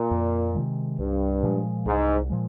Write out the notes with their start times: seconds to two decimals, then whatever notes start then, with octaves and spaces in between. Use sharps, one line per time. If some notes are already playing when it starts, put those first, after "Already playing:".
Already playing: A#2
0.11 F2
0.55 C3 D#3 G#3
0.99 C2 G2
1.43 A#2 F3 G#3
1.86 C2 G#2
2.30 A#2 F3 G#3